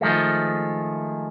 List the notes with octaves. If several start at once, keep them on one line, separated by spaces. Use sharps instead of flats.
D#3 F3 G#3 A3